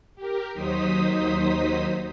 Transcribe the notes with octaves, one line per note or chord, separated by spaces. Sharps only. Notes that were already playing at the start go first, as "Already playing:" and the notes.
G4 A#4
D#2 F#3 D#4 C5 D#6 B6